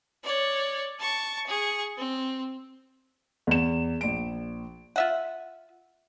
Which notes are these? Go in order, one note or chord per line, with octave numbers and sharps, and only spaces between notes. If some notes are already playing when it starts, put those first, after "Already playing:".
C#5 D5
A5 C#6
G#4 C#6
C4
E2 E7
A#1 D7
F4 E5 F#5